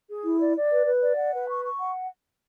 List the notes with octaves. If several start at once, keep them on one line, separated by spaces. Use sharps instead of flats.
G#4
E4
D5
D5
B4
B4
D5
F#5
B4
C#6
C#6
F#5